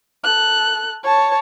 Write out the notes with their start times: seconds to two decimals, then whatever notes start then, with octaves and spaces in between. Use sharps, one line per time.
0.24 A4 F#6
1.04 C#5 A5